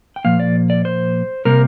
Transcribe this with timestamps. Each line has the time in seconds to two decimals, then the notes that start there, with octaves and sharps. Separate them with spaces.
0.16 G5
0.24 A#2 F3 A#3 F5
0.40 D5
0.70 D5
0.85 C5
1.45 C3 G3 A#3 A#4